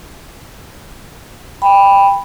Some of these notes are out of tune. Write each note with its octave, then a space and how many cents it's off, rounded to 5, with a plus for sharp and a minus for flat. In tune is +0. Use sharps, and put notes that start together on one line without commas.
G5 +20 B5 +0